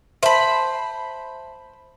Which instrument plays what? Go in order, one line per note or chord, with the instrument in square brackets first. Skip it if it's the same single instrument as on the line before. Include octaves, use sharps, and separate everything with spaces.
[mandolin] C5 B5 [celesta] E5 A5